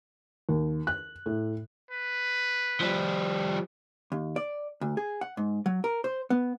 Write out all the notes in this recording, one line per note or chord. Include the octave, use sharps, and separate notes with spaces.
D#2
F#6
A2
B4
F3 G3
D#2
D5
D2
G#4
F#5
G#2
F#3
A#4
C5
B3